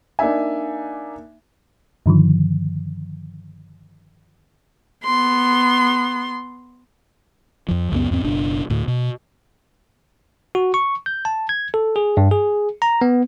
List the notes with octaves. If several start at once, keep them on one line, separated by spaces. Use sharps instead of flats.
A#3 D4 D#4 E5 G#5
G2 D3 D#3 F3
B3 C6
F2 F3
C#2 F#2 G#3 B3
E2 G#2 C4
F#1 B2 D4
D2 A2
B2
F#4
C#6
G6
A5
G#6
A4
G#4
G2
G#4
A#5
B3